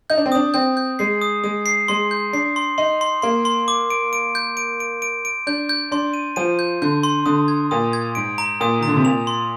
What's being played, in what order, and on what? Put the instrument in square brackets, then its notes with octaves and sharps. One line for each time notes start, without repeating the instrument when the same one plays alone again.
[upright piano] D#4 [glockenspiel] G6
[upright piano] D4
C4
[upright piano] D4 [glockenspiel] D#6
[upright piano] C4 [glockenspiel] G6
[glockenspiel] G6
[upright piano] G#3 [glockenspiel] C7
[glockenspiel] D#6
[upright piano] G#3 [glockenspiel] D#6
[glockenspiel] C7
[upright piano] G#3 [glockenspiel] C6
[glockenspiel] G6
[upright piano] D4 [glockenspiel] C7
[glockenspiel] C6
[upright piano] D#4 [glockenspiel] C6
[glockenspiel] C6
[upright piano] A#3 [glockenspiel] C6
[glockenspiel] C6
D6
D7
D7
G6
D7
D7
D7
D7
[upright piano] D4 [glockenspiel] G6
[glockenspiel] G6
[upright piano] D4 [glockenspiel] C6
[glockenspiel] D#7
[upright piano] F3 [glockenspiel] D#7
[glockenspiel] G6
[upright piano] D3 [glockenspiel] G6
[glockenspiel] C6
[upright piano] D3 [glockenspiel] D#6
[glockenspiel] G#6
[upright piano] A#2 [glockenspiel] D#6
[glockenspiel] G#6
[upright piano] G#2 [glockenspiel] D7
[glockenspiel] A#5
[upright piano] A#2 [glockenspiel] D#6
[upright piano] D#3 [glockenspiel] A#5
[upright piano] D3
C3
[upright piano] A#2 [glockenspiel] F7
[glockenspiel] C6